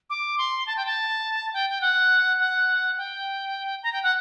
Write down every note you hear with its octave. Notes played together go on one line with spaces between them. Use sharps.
D6
C6
A5
G5
A5
G5
G5
F#5
F#5
G5
A#5
G5
F#5